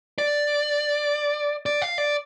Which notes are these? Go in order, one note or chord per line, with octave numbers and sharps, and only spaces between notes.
D5
D5
F5
D5